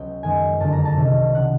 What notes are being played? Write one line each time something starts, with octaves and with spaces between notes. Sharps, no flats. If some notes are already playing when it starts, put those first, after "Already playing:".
Already playing: C#2 C#3 F#3 B3 G5
F#2 D#3 G#3 B3 G#5
F#1 F2 D3 A5
A#5
A5
C2 C3 D#3
C#3 F3 F#5